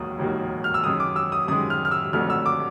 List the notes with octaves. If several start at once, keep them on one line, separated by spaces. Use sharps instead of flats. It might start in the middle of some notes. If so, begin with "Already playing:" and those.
Already playing: E1 D#2 D#3 F#3 A#3 D#6
E1 D#2 D#3 F#3 A#3
F6
E6
F#2 D#3 G#3 D#6
D6
E6
D#6
F#2 D#3 G#3 D#6
F6
F6
E6
F1 F2 D3 F#3 A3 F6
E6
D6